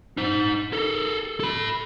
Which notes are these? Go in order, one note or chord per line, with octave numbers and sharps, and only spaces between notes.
D#4 C5
A4 A#4
A4 B5